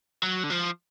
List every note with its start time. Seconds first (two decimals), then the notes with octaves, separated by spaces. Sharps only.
0.23 F#3
0.43 D3
0.50 F3